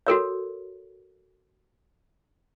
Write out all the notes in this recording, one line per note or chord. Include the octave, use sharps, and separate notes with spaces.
F#4 A4 A#4 C#5